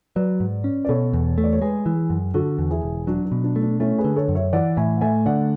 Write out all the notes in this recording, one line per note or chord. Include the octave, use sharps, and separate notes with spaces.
F#3 B4 D5
G#2
C#4
D5
B2 A4 C#5
E2
A3
D5
C#5
G#3 G#4 B4
E3
F#2
D3 F#4 A4
E2
E4 G#4
E1
F#3 D4 F#4
D4
B2
D4
A3
D4
A3 C#4 E4
G#4 B4
D3
A4 C#5
F#2
C#5 E5
E3 D5 F#5
A2 E5 G#5
F#5
A3 E5 G#5
D3 D5 F#5